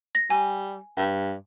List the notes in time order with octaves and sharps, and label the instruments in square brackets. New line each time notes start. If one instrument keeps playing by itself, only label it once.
[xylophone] A#6
[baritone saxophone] G3 [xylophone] G#5
[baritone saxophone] G2